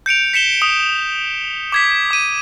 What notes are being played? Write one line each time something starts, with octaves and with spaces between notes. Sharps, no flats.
G6 C#7 D7 F7
B6 C#7 E7 G7
D#6
D6 G#6 B6
D6 D#7